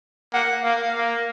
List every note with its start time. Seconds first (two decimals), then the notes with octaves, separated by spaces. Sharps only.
0.33 A#3 F#5
0.64 A#3 F5
0.96 A#3